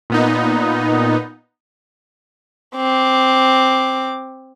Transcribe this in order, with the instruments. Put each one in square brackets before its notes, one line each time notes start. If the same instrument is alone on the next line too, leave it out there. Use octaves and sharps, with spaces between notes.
[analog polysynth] A#2 B3 D#4
[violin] C4 D6